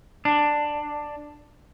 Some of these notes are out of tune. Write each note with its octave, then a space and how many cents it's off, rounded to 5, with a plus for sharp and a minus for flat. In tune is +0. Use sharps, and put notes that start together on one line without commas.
D4 +10